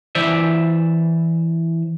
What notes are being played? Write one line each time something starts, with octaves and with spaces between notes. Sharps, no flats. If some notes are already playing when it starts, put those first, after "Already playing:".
E3 C5 D5 E5